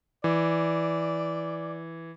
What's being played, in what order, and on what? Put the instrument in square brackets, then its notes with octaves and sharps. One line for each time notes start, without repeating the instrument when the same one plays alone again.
[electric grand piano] E3 [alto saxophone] D5